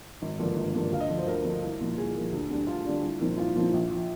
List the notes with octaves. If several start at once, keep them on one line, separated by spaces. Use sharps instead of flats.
G#1
G2 D3 F3 A#3
G#1
G2 D3 F3 A#3
D2 F5
D#5
D3 F3
C5
D2 A#4
D3 F3
C2
A#2 F3
C2 G#4
A#2 F3
D2
D3 G3 D4
D2 F4
D3 G3 D4
C2
A#2 F3 C4 D#4
C2 F4
A#2 F3 C4 D#4
A#1
F3